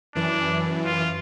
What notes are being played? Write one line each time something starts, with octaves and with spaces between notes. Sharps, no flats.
F#2 E3 D4
F4